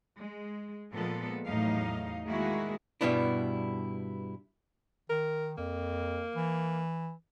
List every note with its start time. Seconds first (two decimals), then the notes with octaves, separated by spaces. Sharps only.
0.17 G#3
0.93 A#2 F3 G#3 B3 A4
1.47 E2 A2 F#3 D#4 F5
2.27 D#3 G#3 A#3 E4 F#4 G#4
3.01 G2 B2 G3 B3 D4 E4
5.09 D#3 A#4
5.58 F2 A#3
6.35 E3